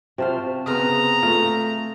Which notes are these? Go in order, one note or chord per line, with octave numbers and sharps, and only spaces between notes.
C3 F4 F#4 C5 A5 F6
C#3 B3 C4 A#5 D#6 F6
A3 F4